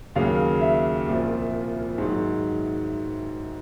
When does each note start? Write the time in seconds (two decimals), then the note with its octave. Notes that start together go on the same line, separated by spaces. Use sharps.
0.15 D#2 C#3 F#3 F5
0.61 E5
1.07 C2 A#2 F3
1.98 G#2 D#3 F#3